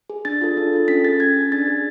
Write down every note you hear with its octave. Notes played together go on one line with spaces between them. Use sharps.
G#4
D4 A6
F4 A4
D4
F4 A4
C#4 B6
G#4 A6
C#4 G#6
G#4
D4 A6
G#4